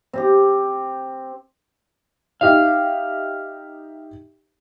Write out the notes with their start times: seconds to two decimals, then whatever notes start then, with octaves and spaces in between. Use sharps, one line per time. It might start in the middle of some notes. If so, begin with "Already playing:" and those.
0.13 C4 G4
2.41 D#4 G4 E5 F5